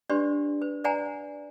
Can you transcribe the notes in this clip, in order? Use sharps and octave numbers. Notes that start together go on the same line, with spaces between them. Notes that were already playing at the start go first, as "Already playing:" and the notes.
D4 G4 B4 D5 C6
B4
B4 D5 F#5 G#5 A#5